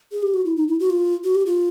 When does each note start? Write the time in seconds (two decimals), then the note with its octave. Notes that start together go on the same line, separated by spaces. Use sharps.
0.12 G#4
0.23 G4
0.34 F#4
0.45 E4
0.56 D#4
0.68 E4
0.80 F#4
0.90 F4
1.24 F#4
1.35 G4
1.46 F4